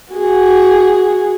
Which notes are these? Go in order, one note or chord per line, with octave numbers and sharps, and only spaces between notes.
F#4 G#4